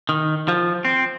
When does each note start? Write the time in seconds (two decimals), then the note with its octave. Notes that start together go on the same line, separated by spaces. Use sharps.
0.09 D#3
0.48 F3
0.85 C4